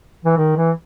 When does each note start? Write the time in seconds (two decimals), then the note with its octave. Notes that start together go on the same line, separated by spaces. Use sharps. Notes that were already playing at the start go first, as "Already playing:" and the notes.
0.25 E3
0.37 D#3
0.56 E3